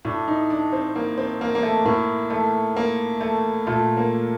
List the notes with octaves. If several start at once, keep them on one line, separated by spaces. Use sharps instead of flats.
A2 D4
D#4
D4
C4
A#3
C4
A#3
A#3
A3
A2 A#3
A3
A#3
A3
A#2 A3
A#3